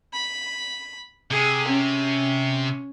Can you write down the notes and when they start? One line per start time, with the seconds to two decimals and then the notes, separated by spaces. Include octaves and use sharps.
0.13 B5
1.31 C3 G#4
1.68 C#4